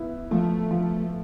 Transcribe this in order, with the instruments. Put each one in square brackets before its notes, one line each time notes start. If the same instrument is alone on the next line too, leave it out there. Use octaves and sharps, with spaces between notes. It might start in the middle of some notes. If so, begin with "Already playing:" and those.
Already playing: [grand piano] B3 E4
[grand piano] F3 [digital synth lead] A3
[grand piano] F3